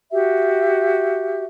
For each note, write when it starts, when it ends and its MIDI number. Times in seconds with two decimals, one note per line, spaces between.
0.11 1.44 66
0.11 1.44 67
0.11 1.44 76